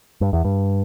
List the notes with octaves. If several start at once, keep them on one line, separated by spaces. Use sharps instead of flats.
G2
E2
G2